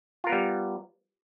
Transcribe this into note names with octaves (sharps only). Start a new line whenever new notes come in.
G3 B3 F4 A#4